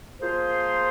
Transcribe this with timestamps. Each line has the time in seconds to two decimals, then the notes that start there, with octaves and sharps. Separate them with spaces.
0.20 F3 A#3 F4 G#4 C5